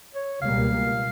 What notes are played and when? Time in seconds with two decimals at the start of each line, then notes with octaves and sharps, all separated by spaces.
0.15 C#5
0.41 C#2 B2 G3 A#3 F5